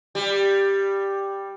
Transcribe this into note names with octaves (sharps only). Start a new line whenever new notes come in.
G3